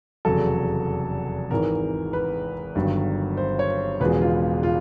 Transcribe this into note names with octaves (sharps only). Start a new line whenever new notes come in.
F1 E2 C#3 F#3 A4
G#1 G#2 E3 A#4
B4
G1 G2 D#3 F#3
C5
C#5
E1 E2 C#3 F3 G#3 B4
F4
F4